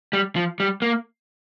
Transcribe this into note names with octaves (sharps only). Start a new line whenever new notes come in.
G3
F3
G3
A#3